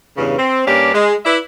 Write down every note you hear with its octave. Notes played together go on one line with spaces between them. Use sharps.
E2 G2 C#3
C4
G2 A#3 C#4 D4 G4
G#3
E4 B4 D5 E5